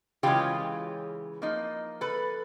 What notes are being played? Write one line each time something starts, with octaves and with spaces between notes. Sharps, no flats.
C#3 E3 G#3 C#4 F4 G4
F3 A#3 D#4
A4 B4